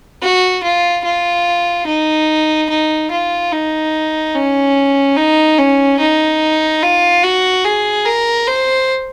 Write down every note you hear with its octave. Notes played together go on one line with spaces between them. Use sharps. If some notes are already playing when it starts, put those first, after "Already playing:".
F#4
F4
F4
D#4
D#4
F4
D#4
C#4
D#4
C#4
D#4
F4
F#4
G#4
A#4
C5